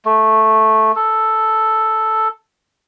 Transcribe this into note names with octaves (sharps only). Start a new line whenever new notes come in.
A3
A4